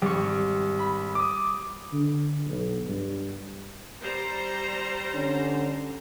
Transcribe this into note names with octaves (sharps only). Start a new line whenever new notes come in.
G#1 G3 C#6
B5
D6 D#6
D3
B1
G2
G3 C5 A#5
D3 C#4